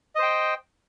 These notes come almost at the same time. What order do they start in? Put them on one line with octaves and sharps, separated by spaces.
D#5 C5 G5